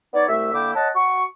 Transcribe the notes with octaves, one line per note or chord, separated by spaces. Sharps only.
B3 D#4 C#5 D5
C2 A3 E5
D3 A#3 E4 G5 D6
C#5 D#5 F#5 A5
F#4 C#6